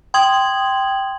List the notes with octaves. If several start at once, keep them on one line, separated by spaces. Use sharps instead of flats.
G5 C6 D#6 G#6 F#7